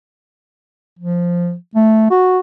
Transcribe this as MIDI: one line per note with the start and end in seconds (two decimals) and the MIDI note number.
0.99 1.54 53
1.75 2.10 57
2.10 2.40 66